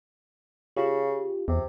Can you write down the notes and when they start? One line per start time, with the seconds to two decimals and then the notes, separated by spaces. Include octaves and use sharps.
0.77 C#3 F4 G4
1.48 E2 C3